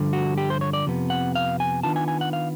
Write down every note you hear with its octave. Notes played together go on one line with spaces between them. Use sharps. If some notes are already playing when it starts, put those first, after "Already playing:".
Already playing: G2 D3 F3
F#4
G4
C5
C#5
D5
F2 C3 B3
F#5
F5
G#5
D#3 F#3 B3 D4 F4 A5
G#5
G#5
F#5
F5